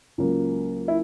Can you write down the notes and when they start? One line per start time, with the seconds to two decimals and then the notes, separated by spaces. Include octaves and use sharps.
0.18 C#2 C#3 F#3 A#3
0.88 E4